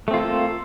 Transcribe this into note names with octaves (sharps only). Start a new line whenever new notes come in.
A3 A#3 C4 F4 A4